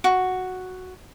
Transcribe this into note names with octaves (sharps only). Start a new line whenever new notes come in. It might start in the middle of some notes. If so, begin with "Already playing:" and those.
F#4